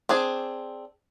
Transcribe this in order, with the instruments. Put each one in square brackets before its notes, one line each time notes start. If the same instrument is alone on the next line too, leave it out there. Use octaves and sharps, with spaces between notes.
[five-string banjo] C4 D4 G#4